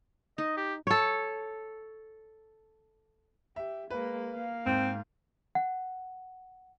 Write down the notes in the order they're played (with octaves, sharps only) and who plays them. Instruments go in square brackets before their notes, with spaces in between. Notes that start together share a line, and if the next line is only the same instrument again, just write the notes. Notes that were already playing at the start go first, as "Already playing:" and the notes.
[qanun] D#4 [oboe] D#5
[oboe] G4
[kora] A4 C#5
[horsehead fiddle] G4 [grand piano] E5
[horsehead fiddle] G#3 A#3 [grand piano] B4
[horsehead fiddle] A#3 F5
[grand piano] G#2 [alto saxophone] C4
[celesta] F#5